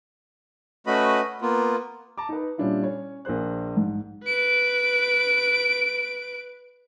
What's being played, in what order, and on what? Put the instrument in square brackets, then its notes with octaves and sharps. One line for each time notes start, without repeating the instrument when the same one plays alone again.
[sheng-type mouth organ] A3 C#4 F#4 B4 D#5 B5
A#3 B3 F4
[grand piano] A5 A#5 D6
D#4 B4
A#2 G3 C#4 D4 E4 F4
C#4 C#5
A#1 A#3 G#4 C5 F#6
G#2
[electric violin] B4 D7